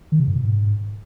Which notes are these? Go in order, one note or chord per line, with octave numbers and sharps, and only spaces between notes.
D#3
C3
G2
B2
G#2